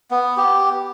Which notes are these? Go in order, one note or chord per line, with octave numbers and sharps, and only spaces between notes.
B3
G4